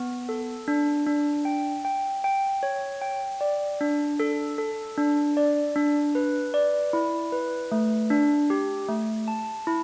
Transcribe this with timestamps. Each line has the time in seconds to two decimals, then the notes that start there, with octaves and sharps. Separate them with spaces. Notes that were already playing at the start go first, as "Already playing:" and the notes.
Already playing: B3
0.29 A4
0.68 D4
1.07 D4
1.45 G5
1.85 G5
2.24 G5
2.63 C#5
3.01 G5
3.41 D5
3.81 D4
4.20 A4
4.58 A4
4.98 D4
5.37 D5
5.76 D4
6.15 B4
6.54 D5
6.93 E4
7.32 B4
7.72 A3
8.10 D4
8.50 G4
8.89 A3
9.28 A5
9.67 E4